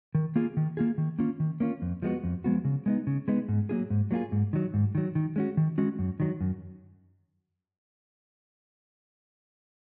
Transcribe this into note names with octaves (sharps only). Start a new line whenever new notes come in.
D#3
A#3 F4 G#4
D#3
A#3 F4 G#4
D#3
A#3 C#4 F4
D#3
A#3 C#4 F4
F2
F3 G#3 B3 F#4
F2
F3 G#3 B3 F#4
C#3
G#3 B3 D#4
C#3
G#3 B3 D#4
G#2
F#3 A#3 F4 G#4
G#2
F#3 A#3 F4 G#4
G#2
D#3 F#3
G#2
D#3 F#3
D#3
G#3 C#4 F#4
D#3
G#3 C#4 F#4
F#2
D#3 F#3
F#2